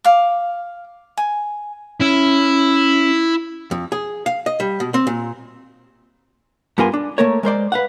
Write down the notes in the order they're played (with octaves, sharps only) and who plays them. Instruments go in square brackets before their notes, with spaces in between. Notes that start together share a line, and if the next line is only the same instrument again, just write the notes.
[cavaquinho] F5 D6
G#5
[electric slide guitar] C#4 [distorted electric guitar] E4
[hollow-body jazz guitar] F2
G#4
F5
D#5
G3
B2
C4
A#2
G2 B3 F4 A#4 G#5 C6
D4
A3 A#3 A#4 C#5
G#3 A#4 C5 D5
B4 F5 F#5